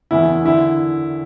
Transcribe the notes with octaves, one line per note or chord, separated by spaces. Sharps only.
F#1 E2 E3 E4
D3 E4